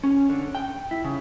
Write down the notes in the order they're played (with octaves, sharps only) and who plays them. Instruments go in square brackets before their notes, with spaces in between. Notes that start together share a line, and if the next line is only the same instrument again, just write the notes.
[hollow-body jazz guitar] C#4
D3
G5
E4
C#3